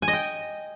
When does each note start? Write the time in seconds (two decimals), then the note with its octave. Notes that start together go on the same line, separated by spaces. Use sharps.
0.02 G#5
0.08 D#5
0.13 G5